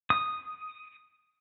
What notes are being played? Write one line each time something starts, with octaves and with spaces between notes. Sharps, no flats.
D#6